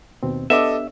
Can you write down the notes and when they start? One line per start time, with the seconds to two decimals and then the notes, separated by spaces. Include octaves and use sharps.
0.23 D#2 B2 C4
0.50 B3 D4 G4 A4 D#5 E5 D6